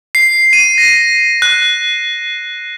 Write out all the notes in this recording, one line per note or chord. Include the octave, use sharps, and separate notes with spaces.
C7
D#7
A#6
F#6